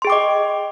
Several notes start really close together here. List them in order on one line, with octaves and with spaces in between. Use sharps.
C6 G#4 G5 D6 D#5